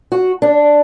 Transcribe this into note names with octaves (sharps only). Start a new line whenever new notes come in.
F#4
D4